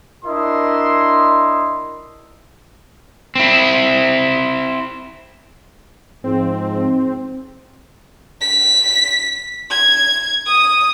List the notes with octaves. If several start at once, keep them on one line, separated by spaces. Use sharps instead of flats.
D4 E4 A#4 D#5 C6
C4 E4
G#2 F3 C4
B6
G#6
D#6